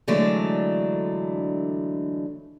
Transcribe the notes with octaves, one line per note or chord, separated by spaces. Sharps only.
D3 E3 F#3 G#3 A3 D4